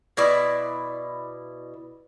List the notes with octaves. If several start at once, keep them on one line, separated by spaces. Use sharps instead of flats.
B2 E4 D5 E5